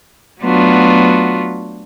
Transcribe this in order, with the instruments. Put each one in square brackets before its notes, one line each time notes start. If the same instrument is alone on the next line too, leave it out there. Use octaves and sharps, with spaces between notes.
[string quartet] F#3 A3 B3 D4 F4 F#4